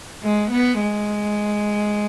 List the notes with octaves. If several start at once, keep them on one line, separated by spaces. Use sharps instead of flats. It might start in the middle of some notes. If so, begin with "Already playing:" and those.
G#3
B3
G#3